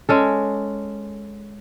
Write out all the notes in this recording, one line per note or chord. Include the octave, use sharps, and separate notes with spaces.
G#3 C#4 A4